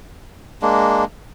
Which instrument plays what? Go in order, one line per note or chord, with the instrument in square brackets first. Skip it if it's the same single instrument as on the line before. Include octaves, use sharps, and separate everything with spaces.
[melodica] G#3 A#3 D4